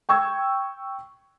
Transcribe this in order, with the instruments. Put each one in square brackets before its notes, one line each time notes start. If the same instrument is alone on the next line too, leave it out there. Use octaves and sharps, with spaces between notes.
[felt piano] G5 C#6 E6 G#6